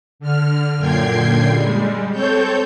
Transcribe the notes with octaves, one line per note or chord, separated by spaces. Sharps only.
D3 F6
F#2 A#2 D3 G5 G#6 C7
G3 G#3
C4 A4 C#5 G6